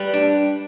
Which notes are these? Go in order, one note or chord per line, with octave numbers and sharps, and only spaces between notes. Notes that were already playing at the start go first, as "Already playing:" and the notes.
Already playing: G3 B4
D4